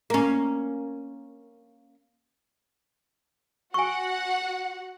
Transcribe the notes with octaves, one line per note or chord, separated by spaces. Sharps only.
A#3 C#4
F#4 F#5 G#5 C#6